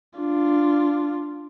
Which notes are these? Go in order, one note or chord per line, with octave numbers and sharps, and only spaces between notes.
D4 F4